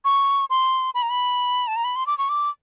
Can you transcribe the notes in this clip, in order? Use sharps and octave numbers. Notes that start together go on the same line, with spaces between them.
C#6
C6
B5
A#5
B5
A5
A#5
B5
C6
D6
C#6
D6